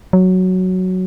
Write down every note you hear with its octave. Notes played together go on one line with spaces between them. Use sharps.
F#3